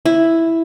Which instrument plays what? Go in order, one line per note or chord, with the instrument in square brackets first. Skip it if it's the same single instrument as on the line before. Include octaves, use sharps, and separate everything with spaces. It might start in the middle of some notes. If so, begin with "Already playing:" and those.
[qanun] E4